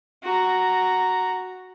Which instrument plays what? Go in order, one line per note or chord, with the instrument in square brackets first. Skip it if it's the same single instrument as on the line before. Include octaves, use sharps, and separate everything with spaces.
[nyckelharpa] F#4 A#5